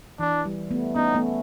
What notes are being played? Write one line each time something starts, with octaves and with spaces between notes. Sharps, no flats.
E3 D4
G3
A3 B3
B3 C#4 D#4
A3 B3